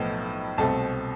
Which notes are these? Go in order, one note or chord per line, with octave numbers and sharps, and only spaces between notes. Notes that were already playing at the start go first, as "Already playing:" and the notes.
Already playing: B1 A2 F3 B3
C2 B2 A3 C4 A5